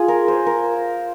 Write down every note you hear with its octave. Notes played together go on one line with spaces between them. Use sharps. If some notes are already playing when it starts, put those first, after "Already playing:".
Already playing: F4 G#4
A#4
C5
A#4